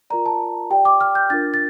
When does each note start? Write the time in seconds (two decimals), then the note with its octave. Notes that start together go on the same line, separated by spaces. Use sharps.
0.10 F4 A#4 D5 A#5
0.26 A5
0.70 G4 D5 G5
0.85 D6
1.01 F6
1.15 G6
1.30 D4 F4 A#4 A6
1.54 A6